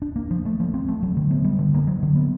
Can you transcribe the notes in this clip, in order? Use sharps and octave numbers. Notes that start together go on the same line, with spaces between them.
D4
A#3
F3
A3
F3
C4
A3
F#3
D3
B3
G3
D3
A#3
F#3
D3
B3